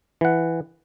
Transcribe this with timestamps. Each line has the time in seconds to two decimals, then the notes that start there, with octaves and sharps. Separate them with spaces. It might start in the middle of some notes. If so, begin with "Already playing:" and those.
0.21 E3 F#5